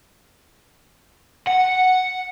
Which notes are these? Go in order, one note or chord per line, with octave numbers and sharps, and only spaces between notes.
F#5